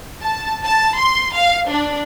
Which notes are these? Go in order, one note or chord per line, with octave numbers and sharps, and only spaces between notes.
A5
A5
C6
F5
D4